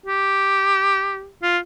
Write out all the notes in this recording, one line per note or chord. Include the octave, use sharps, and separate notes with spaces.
G4
F4